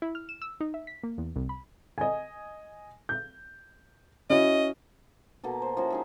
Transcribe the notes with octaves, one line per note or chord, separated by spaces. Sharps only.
E4
F6
E7
E6
D#4
E5
B6
A#3
E2
C2
B5
D#5 G#5
G6
C#4 E4 F#4 D#5
B2 A#3 A4
C5
F3 C#4 E4 F#4
D#4 G#4 E5